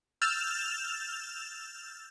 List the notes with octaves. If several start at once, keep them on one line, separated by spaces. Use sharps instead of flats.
E6 F6 G6 A6 E7 F7